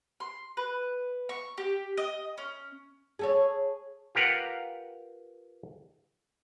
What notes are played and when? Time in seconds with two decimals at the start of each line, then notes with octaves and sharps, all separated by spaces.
0.20 C6
0.57 B4
1.29 C#6
1.58 G4
1.97 D#5
2.38 C#4
3.19 G#4 A4 C#5
4.15 F4 G4 A#4 B4 F#5